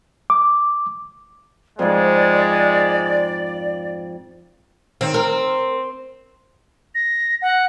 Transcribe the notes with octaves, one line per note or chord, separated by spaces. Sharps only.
D6
F2 G#2 G#3 D5
D#3 C4
A#4
A#6
F#5